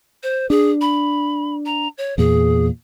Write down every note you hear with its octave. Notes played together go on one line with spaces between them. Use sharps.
C5
D4 G#4
B5
A#5
C#5
E2 A#2 G#4